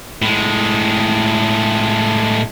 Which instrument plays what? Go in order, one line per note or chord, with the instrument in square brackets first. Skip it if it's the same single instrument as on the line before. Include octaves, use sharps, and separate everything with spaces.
[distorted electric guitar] A2 G#3